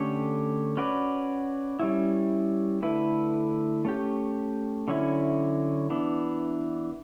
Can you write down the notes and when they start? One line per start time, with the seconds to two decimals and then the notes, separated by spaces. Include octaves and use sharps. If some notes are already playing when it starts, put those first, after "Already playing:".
Already playing: D3 A3 C#4 G4 C#5
0.77 C#4 F#4 B4 D5
1.79 G3 C#4 E4
2.82 D3 A3 E4 B4
3.85 A3 C#4 G4
4.88 D3 F#3 C#4 E4
5.90 E3 B3 D4